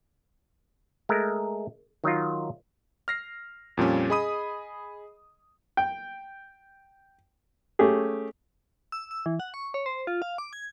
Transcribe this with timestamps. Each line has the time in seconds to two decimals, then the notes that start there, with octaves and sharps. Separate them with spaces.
1.09 G#3 A3 A#4
2.04 D#3 F#3 D#4 F4
3.08 F6 A#6 C7
3.77 F2 A#2 G3 C#4
4.10 G#4 D#5 B5 D#6 D#7
5.77 G5
7.79 A3 C#4 G4 G#4
8.92 E6
9.11 E6
9.26 E3
9.40 F#5
9.54 C#6
9.74 C#5
9.86 C5
10.07 F4
10.22 F5
10.38 D6
10.53 G#6